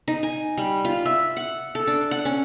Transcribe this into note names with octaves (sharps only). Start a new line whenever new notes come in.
D#4
G#5
G3
F4
E5
F#5
A4
D4
F#5
C#4